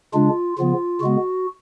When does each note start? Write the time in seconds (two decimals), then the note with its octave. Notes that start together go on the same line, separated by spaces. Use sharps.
0.14 C#3 G#3 D4 F4
0.58 C#3 F3 B3 F4
1.01 C#3 G#3 B3 F#4